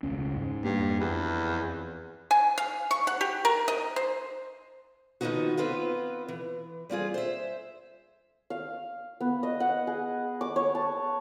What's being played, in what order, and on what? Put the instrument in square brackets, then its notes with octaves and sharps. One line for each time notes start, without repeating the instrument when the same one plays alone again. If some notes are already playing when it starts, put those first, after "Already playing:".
[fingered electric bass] E1 C#2 C#4
G#2
[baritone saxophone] G2 [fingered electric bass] A#3
[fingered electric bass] F2
[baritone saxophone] E2
[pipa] G#5
F5
C#6
F#5
G4
A#4
D#5
C5
[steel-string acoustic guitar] D#3 F3 A#3 B3 D#4 F#4
B3 C4 F4 B4
E3
G3 C4 F4 G#4
C5 E5
[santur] F5
B3
D#5
F#5
G#4
D6
C#5
A5